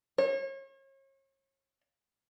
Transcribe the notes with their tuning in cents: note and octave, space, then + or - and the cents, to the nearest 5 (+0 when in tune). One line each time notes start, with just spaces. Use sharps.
C#5 -35